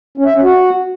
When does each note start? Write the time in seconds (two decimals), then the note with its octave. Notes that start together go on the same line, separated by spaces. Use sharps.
0.18 C#4
0.26 E5
0.35 C#4
0.43 F#4